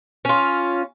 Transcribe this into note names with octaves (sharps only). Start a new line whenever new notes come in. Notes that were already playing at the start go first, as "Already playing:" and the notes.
C#4 F4